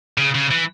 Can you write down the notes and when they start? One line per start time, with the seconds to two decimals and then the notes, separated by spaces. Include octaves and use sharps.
0.18 C#3
0.35 C#3
0.51 E3